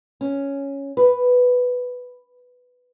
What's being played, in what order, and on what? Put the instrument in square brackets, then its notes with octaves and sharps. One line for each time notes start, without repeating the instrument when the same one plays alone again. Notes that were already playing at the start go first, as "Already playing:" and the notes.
[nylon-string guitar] C#4
B4